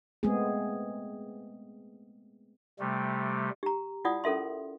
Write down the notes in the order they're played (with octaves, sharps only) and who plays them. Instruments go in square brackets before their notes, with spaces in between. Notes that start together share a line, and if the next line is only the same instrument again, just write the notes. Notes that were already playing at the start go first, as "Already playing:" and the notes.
[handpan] G#3 A3 B3 C4 G#4
[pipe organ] C3 G3 A3
[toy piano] G4 A#5
E4 F4 D5 F#5 D#6
C#4 A4 A#4 E5 C6